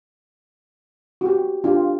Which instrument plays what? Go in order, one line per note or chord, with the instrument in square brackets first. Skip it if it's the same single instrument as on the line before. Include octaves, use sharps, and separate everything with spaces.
[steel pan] F#4 G4
D4 F4 G4